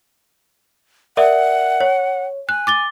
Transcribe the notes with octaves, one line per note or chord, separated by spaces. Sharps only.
A#4 D5 E5 F#5
C#5
G#5 F#6
D6 A6 G7